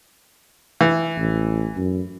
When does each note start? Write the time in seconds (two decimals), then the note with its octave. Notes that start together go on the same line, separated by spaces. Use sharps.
0.81 E3
1.17 A1
1.76 F#2